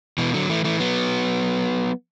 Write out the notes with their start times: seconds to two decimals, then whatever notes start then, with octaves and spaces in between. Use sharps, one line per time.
0.18 B2 E3
0.34 D3 F#3
0.49 E3 A3
0.64 E3 A3
0.80 F#3 B3